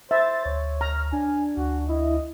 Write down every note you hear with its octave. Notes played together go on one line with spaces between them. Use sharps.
C5 E5 A6
D2 C#5
A#5 F6
D4 G#5
D2 F#4
E4 D#5